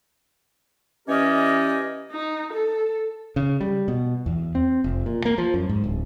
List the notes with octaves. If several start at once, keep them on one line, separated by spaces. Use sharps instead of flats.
E3 C#4 G4 A#4 D5 D#5
D#4
A4
C#3
G3
B2
E2
C4
F1
A#2
A#3
F3
F#2
G#2
D1